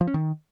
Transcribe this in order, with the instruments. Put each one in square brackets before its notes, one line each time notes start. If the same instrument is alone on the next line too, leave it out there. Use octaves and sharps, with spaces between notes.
[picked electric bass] F3
C#4
D#3